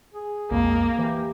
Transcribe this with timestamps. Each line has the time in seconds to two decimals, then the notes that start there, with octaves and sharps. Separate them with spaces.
0.14 G#4
0.51 B1 F2 G#3 A#3
0.98 E3 G4